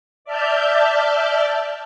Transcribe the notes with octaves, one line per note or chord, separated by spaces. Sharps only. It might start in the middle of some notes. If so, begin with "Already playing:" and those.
D5 E5 A5 F6 G6